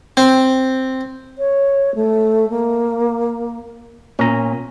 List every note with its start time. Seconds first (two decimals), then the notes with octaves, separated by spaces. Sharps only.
0.17 C4
1.38 C#5
1.95 A3
2.49 A#3
4.19 A#2 C#4 A#5